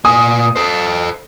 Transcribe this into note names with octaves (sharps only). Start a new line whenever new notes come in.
A#2 G#5 D#6
A4 C5